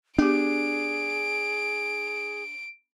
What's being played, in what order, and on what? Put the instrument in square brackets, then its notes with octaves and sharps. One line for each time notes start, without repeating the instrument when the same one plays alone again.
[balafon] B3 G4 [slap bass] D4 [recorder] G#4 [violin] D7